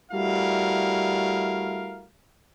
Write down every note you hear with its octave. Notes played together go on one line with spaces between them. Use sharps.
G3 A3 E4 F#4 A#4 F5